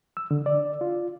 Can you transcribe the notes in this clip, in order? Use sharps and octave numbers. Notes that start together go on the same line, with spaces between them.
E6
D3
D5
F4